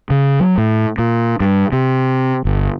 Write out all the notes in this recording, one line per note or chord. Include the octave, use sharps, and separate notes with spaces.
C#3
F#3
A2
A#2
G2
C3
G1